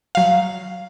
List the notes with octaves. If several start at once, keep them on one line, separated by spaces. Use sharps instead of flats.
F#3 F5